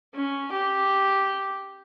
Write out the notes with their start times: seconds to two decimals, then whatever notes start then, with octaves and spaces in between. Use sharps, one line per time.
0.14 C#4
0.52 G4